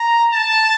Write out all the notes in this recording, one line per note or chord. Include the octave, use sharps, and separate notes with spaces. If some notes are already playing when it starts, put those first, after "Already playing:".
Already playing: A#5
A5